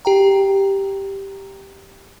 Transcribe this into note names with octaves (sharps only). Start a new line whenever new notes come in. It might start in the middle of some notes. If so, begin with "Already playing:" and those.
G4 G5 A#5